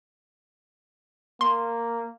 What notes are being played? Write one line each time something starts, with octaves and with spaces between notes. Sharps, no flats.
A#3 C6